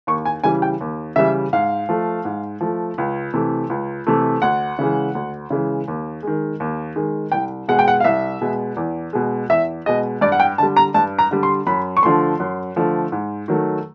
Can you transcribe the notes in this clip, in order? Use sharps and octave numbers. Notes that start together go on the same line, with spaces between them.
D#2 C#6
G#5
C#3 E3 G3 G#5
G5
D#2
C#3 E3 G3 E5
G#2 F5
F3 A3
G#2
F3 A3
C#2
C3 E3 A3
C#2
C3 E3 A3
D2 F#5
C#3 E3 G#3
D2
C#3 E3 G#3
D#2
D#3 G#3
D#2
D#3 G#3
C2 G5
B2 G#3 F#5
G5
F#5
F5
C2 E5
B2 G#3
E2
B2 G#3
E2 E5
B2 G#3 D#5
G2 D5
F#5
G5
D3 G3 A5
A#5
G2 A5
A#5
D3 G3
C6
F#2 B5
C#6
D3 F3 A3 C6
F#2
D3 F3 A3
G#2
D#3 F#3 A3